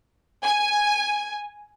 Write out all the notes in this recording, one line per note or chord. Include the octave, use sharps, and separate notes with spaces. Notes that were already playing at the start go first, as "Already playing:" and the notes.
G#5